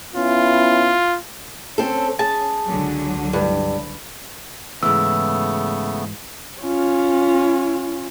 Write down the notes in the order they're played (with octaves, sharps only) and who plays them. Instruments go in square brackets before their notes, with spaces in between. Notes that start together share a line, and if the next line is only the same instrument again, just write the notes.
[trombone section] B3 C#4 E4 [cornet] F4
[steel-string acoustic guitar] C4 A4 [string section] C#4
[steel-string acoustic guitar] G#4 [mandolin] A5
[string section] C#2 D3 F#3
[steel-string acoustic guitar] G2
[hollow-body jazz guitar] G#2 E3 [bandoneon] C#3 A3 B3 [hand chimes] E6
[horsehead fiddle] C#4 F4